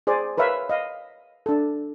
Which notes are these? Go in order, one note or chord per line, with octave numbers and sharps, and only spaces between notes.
G#4 C5 D5
A#4 B4 C#5 E5 F5
D#5 F5
D4 A4